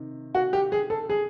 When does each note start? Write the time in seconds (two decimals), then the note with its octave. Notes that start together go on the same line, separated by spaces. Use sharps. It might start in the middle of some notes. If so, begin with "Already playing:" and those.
Already playing: C3 D#3
0.35 F#4
0.53 G4
0.72 G#4
0.90 A4
1.09 G#4